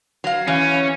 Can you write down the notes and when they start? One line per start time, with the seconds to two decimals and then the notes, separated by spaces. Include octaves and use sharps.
0.24 F#3 F5
0.48 E3 C#4